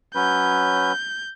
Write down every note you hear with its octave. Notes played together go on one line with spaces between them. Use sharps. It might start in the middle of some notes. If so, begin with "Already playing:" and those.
F#3 C#4 B4 G6